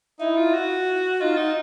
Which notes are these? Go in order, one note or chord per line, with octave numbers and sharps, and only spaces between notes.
D#4 E4
F4
F#4
D#4 F4
D#4